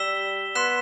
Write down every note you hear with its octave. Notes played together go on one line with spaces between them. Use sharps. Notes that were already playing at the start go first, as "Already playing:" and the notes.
Already playing: G3 E6 B6 E7 G7
B3 C6 F#6 B6 E7